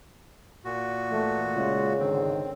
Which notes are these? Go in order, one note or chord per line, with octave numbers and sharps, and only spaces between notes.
A#2 F#4
E3 A3
C#3 G#3 F4
G#2 D3 D#3 C4